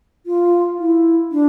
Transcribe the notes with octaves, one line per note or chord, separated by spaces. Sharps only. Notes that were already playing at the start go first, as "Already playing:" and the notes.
F4
E4
D4